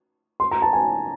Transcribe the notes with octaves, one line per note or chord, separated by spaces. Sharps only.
C6
A#5
A5
G#5